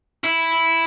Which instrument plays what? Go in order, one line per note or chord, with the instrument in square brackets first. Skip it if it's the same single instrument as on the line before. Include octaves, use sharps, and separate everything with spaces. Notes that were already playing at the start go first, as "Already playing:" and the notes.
[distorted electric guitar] E4